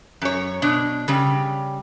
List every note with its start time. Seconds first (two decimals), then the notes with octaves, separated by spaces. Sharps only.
0.22 F#2 C#5
0.62 B2 D4
1.08 C#3 G3